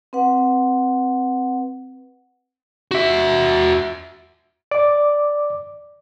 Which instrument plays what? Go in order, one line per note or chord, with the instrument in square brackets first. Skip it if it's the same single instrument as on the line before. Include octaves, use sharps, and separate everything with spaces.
[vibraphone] C4 B4 F#5
[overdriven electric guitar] F#4 E5
[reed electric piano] D5 D6